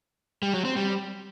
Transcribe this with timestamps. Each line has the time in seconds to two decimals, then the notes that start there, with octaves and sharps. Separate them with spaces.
0.43 G3
0.54 F#3
0.65 C4
0.76 G3